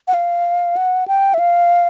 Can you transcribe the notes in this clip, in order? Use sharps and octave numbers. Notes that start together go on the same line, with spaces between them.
F#5
F5
F#5
G5
E5
F5